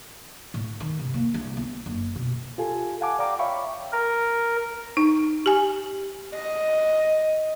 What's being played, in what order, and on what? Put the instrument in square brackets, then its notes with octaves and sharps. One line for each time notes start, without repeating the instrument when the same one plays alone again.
[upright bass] A2
D#3
C3
A#3
C2
B3
F#1
B2
[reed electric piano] F4 G4 A4 G#5
F5 F#5 G#5 A5 D6
D5 F5 G5 A#5 D6
C#5 E5 F5 G5 B5 C#6
[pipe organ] A#4
[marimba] D#4
G4 G#5
[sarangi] D#5